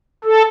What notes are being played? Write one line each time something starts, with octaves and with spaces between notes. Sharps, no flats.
A4